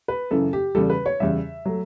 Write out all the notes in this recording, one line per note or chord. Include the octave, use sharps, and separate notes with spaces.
B4
F#2 C#3 E3 A4
G4
E2 C#3 G3 A4
B4
C#5
E2 C#3 G3 E5
F#3 A3